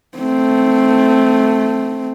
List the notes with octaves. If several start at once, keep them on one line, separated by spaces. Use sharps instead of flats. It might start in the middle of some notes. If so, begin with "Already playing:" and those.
A3 C4